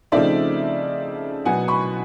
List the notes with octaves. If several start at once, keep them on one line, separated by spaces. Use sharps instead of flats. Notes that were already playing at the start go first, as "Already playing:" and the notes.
C#3 F3 A3 C4 D#4 D5 E5
B2 F#3 B3 F#5 G#5
B5 C#6